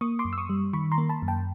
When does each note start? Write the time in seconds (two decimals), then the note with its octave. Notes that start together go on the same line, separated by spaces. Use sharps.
0.01 A#3 C#6 D#6
0.19 C6 D6
0.25 F#2
0.33 E6
0.38 C#6 D#6
0.49 G3
0.73 D#3 B5 C#6
0.92 A#5 C6
0.98 A#3
1.09 A5 B5
1.22 F#2
1.28 G5 A5